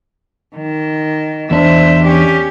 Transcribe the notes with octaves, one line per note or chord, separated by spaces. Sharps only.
D#3
E2 D4 C5 E5
C#4 G4